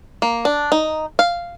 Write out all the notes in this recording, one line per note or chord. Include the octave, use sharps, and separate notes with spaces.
A#3
D4
D#4
F5